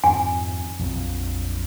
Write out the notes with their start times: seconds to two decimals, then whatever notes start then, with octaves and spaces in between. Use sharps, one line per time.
0.04 F2 G#2 D#3 G#5
0.79 A#1 F2 F#3